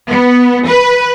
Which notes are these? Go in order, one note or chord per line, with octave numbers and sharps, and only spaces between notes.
B3
B4